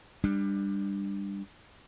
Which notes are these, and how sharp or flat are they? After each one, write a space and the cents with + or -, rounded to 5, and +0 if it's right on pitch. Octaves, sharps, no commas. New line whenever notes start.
G3 +25 D4 +15